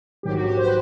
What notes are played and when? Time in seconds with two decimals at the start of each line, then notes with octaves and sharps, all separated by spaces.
0.23 A#1 G#2 D#3 F#3 G4
0.33 F#4
0.44 G4
0.57 C5
0.64 B4